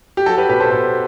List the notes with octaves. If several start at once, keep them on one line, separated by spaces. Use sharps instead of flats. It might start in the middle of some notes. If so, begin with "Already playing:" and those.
G4
F#3 F#4 A4
G4 B4
B2 G4 B4
A4 C5
B2 A4 C5